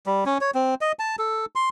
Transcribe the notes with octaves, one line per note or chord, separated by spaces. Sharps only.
G3
C#4
C#5
C4
D#5
A5
A4
C6